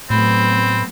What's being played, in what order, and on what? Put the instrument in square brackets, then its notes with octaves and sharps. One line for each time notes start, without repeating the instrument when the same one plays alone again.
[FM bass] A2 [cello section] F#3 A3 B3 [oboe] C4 [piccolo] B5